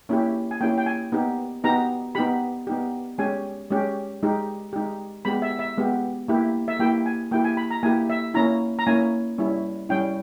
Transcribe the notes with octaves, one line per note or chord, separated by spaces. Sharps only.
A#3 C#4 E4 G4
G#5
A#3 C#4 E4 G4 G5
G5
G#5
B3 D#4 G4
B3 D#4 G4 A#5
B3 D#4 G4 B5
B3 D#4 G4
G#3 C#4 G4 G#5
G#3 C#4 G4
G#3 D#4 G4
G#3 D#4 G4
G#3 B3 G4 B5
E5
E5
G#3 B3 G4
A#3 E4 G4
E5
A#3 E4 G4 G5
G#5
A#3 E4 G4 G5
G#5
B5
A#5
A#3 E4 G4 G#5
E5
A#3 C#4 E4 A#5
A#5
A#3 C#4 E4 G#5
G3 C#4 E4
G3 C#4 E4 G5